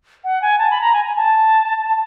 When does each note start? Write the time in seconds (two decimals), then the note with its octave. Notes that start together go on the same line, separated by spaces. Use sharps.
0.24 F#5
0.42 G#5
0.58 A5
0.71 B5
0.81 A#5
0.93 G#5
1.05 G#5
1.16 A5